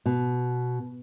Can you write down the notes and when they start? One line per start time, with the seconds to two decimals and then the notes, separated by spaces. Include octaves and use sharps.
0.06 B2